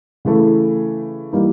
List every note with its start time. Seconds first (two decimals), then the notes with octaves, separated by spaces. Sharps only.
0.25 C#3 E3 A3
1.33 E3 G3 A#3 D#4